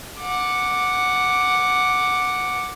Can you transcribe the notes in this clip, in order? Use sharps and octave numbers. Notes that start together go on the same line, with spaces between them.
F#5 D6